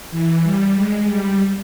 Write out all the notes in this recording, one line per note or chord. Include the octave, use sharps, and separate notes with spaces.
E3
G3
G#3
G3